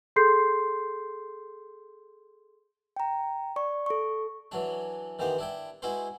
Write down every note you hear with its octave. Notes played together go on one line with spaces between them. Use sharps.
G#4 A4 C6 G6 C7
G5 A#5
D5 C#6
A4 C#6
E3 F#3 D4
D#3 E3 B3 G4 C5
D4 E4 G5
G#3 E4 F#4 B4 C5